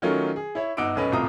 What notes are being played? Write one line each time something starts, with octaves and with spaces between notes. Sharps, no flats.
D#3 F#3 A3 C#4 F4 A#4
G#4
E4 C#5 E5
G1 D#4 F#5 D6 E6 D7
D#1 B1 C#4 A4 B4 D#5
D#1 A2 C3 F4 A#5 D#6